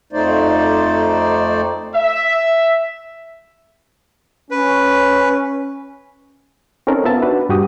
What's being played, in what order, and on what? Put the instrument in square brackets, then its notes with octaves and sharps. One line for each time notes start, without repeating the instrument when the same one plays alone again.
[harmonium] F2 A3 D#4 C5 D5
[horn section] E5
[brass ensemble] C#4 [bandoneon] B4
[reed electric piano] C4 C#4 D#4 A4 A#4
B3 F4 E5 A5
D4 D#4 F#4 B4
G2 F#4 G4 D#6